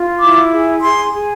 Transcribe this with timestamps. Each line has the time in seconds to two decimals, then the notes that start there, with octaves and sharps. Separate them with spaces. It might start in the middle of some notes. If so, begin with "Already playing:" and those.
Already playing: F4
0.20 E4 D6
0.51 G#4
0.82 G#4 C6
1.13 G#4